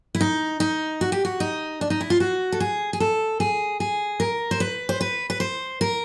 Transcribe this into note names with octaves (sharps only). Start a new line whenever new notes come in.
E4
D#4
D#4
F#4
G4
F#4
D#4
D4
D#4
E4
F4
F#4
A4
G#4
G#4
A4
G#4
G#4
A#4
C5
B4
C5
B4
B4
C5
A#4